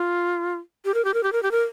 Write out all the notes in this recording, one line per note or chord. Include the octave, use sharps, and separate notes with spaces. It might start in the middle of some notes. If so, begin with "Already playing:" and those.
Already playing: F4
G4
A#4
G4
A#4
G4
A#4
G4
A#4